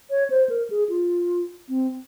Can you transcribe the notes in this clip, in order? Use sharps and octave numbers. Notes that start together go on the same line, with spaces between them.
C#5
C5
A#4
G#4
F4
C4